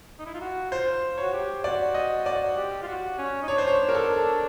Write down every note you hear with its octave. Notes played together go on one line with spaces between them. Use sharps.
D#4
E4
F4
F#4
F4 C5
F#4 C#5
G4
F#4 D5
D#5
D5
G4
F4
F#4
C#4
D#4
D4 C#5
C5
C#5
A#4
A4